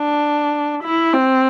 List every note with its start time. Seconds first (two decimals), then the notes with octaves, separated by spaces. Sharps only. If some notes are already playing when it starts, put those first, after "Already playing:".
Already playing: D4
0.83 E4
1.14 C4